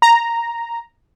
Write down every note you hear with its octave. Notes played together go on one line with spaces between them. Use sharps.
A#5